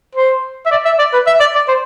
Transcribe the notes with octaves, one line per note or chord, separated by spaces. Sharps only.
C5
E5
D5
E5
D5
B4
E5
D5
D5
C5